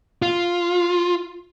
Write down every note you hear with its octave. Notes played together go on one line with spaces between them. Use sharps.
F4